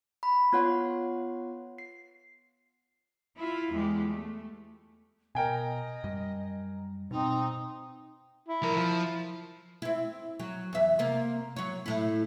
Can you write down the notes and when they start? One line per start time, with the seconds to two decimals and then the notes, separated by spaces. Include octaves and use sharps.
0.23 B5
0.53 B3 F4 C#5 F#5 C6
1.78 C7
3.37 E4 F4
3.72 E2 G#3 G4
4.08 A3
5.35 B2 A#4 D#5 G5 G#5
6.04 F#2 G3
7.11 B2 C4 D#4
8.48 E4
8.62 F3 A#4
8.77 F3
9.82 C4 E4
10.40 F#3
10.73 E2 E5
10.99 C3 A#3
11.56 F#3 C#5
11.86 A2 E4